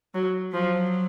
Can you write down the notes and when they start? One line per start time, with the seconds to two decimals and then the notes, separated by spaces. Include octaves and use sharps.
0.14 F#3
0.53 F3 F#3